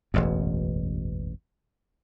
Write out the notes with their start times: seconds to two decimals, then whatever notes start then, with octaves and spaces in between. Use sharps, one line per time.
0.14 E1 A1 F#2